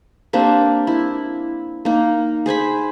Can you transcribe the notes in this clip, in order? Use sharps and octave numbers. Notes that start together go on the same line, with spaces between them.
A#3 C4 D4 G4
E4
A#3 D#4
G#4 C5 G#5 B5